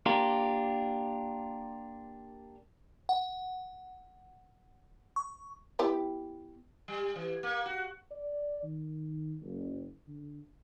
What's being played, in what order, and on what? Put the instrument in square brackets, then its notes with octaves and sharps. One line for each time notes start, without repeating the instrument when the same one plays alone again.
[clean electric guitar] A#3 D4 F4 G4 A#4
[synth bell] F#5
C#6
[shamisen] B3 E4 G4
[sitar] G3
E3
A#3
F#4
[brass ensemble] D5
D#3
F#1
D3